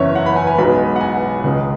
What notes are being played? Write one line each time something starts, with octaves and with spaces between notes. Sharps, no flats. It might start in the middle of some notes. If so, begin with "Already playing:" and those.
Already playing: F#1 E2 E3 C#4 C#5 E5
F#5
B5
G#5
G#5
B1 B2 G#3 B5
F#5
G#5
C#2 C#3 G#3